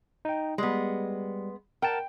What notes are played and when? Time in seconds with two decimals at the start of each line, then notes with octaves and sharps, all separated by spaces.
0.25 D#4 G5
0.58 G3 G#3 B3
1.82 A#4 F#5 G5 A5